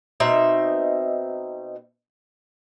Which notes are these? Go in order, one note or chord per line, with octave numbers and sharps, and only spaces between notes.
B2 C4 D#4 E5